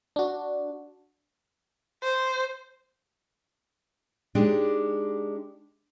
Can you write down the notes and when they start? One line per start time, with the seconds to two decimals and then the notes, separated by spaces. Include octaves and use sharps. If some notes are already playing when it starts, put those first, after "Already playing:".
0.16 D4 F#4
2.03 C5
4.35 G#3 D4 D#4 G4